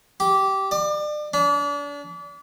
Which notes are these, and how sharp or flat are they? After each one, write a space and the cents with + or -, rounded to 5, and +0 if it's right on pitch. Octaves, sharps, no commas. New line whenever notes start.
G4 -15
D5 +35
D4 -35